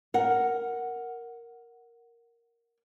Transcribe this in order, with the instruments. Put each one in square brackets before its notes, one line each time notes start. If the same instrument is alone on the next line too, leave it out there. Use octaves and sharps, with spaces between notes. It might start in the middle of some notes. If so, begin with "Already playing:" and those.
[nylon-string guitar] A#4 F#5